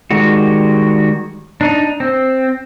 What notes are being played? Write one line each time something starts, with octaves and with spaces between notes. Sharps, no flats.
D#3 G3 G#3 F#4
D4 D#4
C4